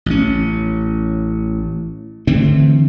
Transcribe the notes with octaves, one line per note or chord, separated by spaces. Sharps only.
A1 C#4
D3 E3 A3 C4